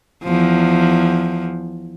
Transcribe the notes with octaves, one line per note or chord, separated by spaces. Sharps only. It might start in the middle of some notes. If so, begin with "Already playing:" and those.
E2 F3